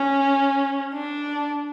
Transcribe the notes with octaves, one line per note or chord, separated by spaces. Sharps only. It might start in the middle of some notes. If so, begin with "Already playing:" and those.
Already playing: C#4
D4